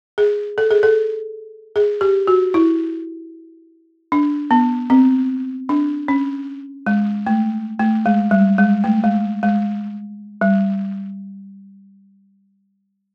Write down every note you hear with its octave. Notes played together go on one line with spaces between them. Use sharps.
G#4
A4
G#4
A4
G#4
G4
F#4
E4
D4
B3
C4
D4
C#4
G#3
A3
A3
G#3
G3
G#3
A3
G#3
G#3
G3